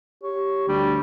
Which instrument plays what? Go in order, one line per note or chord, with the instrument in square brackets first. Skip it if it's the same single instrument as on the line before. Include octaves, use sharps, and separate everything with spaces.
[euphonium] G4 [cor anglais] C#5
[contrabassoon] D2 [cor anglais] G3